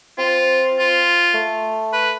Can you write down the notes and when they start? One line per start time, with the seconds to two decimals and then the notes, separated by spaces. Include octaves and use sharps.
0.18 C4 F4
0.79 F4
1.34 A3
1.93 B4